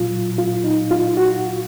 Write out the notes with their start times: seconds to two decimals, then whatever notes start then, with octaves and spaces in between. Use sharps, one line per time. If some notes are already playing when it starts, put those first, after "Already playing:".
Already playing: A#2 F#3 F4
0.38 F4
0.64 D#4
0.91 F4
1.17 F#4